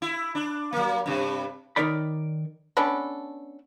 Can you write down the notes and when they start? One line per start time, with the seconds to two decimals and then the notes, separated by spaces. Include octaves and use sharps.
0.02 E4
0.35 D4
0.73 F#3 A#3
1.06 G2 C3
1.76 D#3 D#4 A#4 C#5 D5 B5
2.77 B3 C#4 D4 A4